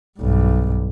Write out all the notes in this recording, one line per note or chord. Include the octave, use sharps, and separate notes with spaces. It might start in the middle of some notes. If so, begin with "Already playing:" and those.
B1 G2